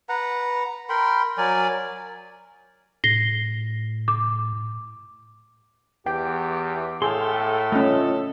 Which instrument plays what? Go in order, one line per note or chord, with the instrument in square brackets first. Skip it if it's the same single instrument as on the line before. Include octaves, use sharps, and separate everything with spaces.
[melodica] B4 F#5 A#5
A#4 G5 B5 C6
F#3 A#4 D5 G#5
[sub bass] A2 [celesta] A#6 C7 G7
[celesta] D6
[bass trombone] E2 [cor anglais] G4 [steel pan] G5
[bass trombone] A2 [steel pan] G#4 [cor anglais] A4 [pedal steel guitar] F5 G5 C6
[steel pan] A3 C#4 [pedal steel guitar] F4 D#5